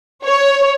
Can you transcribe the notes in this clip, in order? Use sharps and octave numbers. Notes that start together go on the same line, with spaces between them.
C#5